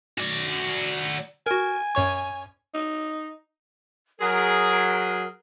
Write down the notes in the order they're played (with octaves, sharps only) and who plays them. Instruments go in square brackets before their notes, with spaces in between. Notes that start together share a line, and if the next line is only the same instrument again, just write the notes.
[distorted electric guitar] F#4 D5
[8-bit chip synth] F#4 A#4 [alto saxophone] G#5
[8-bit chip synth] F#2 C#5 C#6
[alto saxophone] D#4
[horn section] F#3 G#4 [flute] A#4